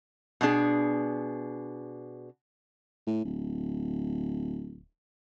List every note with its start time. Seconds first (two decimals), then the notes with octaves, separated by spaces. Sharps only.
0.41 B2 B3 D4 G#4
3.07 A2
3.24 D1